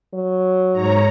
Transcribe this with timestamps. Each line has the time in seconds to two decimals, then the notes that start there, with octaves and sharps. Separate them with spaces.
0.14 F#3
0.73 G#2 C#5 A#5